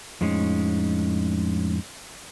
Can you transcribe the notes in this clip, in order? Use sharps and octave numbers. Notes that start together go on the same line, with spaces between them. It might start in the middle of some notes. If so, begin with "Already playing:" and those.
F2 A2 G#3 C#4 D#4